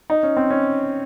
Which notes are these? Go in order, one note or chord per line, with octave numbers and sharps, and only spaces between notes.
D#4
C#4
C4
C#4